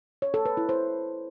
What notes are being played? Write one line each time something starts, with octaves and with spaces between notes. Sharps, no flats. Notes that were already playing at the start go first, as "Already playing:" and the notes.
C#5
A4
B4
E4
C5